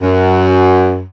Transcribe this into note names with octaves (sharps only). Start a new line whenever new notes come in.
F#2